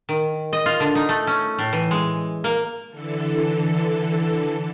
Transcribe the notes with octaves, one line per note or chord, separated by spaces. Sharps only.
D#3
D#5
F4
D3
D#4
A3
C#4
A2
E3
G#3
A#3
D3 E3 A4